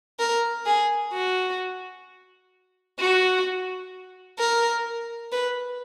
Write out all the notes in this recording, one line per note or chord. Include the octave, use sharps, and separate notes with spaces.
A#4
G#4
F#4
F#4
A#4
B4